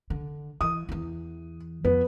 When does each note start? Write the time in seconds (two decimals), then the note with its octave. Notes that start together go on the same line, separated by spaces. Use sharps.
0.10 D3
0.61 E3 D#6
0.89 E2 E3
1.84 F2 B3 B4